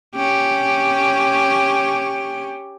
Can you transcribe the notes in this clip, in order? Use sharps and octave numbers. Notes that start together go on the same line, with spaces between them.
C#4 G4